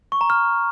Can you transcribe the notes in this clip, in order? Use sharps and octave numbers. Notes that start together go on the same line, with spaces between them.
C#6
A#5
F6